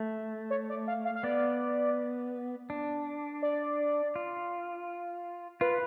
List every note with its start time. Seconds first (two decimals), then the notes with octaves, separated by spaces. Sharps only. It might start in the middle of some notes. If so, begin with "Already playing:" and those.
Already playing: A3
0.51 C#5
0.70 D5
0.88 F5
1.05 F5
1.16 F5
1.23 B3 D5
2.70 D4
3.43 D5
4.16 F4
5.61 F4 B4